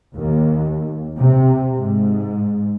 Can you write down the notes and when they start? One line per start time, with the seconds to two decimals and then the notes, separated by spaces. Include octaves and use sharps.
0.15 D#2
1.18 C3
1.76 G#2